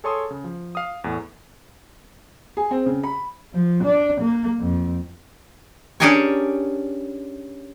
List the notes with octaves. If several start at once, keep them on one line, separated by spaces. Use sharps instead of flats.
G#4 A4 C#5 A5 C6 D#6
C#3
F3
F5 D#6
E2 A2
G#4
C4
C#3
B5
F3
D4
A#3
F2
C#4 D4 G4 G#4 A#4 C#5